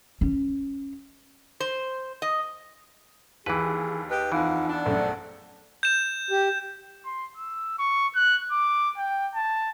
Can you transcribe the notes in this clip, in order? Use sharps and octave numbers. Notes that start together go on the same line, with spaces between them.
C#4
C5
D#5
D#2 E3 G#4 B4
G4 B4 D#5
F2 E3 D#4 F5 F#5
B3 D4
A#1 F#2 A3 A4
G6 E7
G4
C6
E6
C#6
F#6
D6
G5
A5